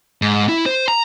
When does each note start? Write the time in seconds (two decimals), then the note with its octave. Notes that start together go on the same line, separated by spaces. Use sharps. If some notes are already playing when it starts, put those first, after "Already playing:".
0.22 G#2
0.49 E4
0.66 C5
0.88 A#5